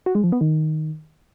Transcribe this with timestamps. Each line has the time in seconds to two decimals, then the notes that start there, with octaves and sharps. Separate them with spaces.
0.06 F#4
0.15 G#3
0.24 F3
0.32 B3
0.41 D#3